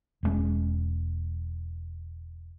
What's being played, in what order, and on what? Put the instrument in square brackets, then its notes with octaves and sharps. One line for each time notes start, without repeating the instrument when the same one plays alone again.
[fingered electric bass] E1 G2 G#3 C#4